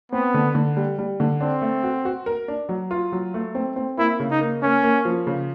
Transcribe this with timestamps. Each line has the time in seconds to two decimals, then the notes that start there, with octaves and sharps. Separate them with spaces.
0.12 B3 C4
0.34 D3
0.55 D3
0.77 G3
0.98 G3
1.20 D3
1.40 C4 D4
1.62 A3
1.84 F#4
2.05 F#4
2.26 A#4
2.48 D4
2.69 F#3
2.91 F4
3.12 F#3
3.34 A3
3.55 C4
3.76 C4
3.98 A#3 E4
4.20 C#3
4.31 D#4
4.41 A#3
4.62 A#3 C#4
4.83 A#3
5.05 F3
5.27 C#3